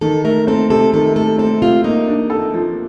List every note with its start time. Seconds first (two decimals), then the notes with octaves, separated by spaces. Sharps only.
0.01 D#3 A4
0.24 A3 A#4
0.47 C4 A4
0.70 C3 A4
0.94 D#3 A4
1.16 A3 A4
1.38 C4 A4
1.62 C3 F4
1.84 A#3 D#4
2.07 D4
2.30 A4
2.54 F3